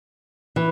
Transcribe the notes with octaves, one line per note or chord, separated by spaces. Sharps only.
E3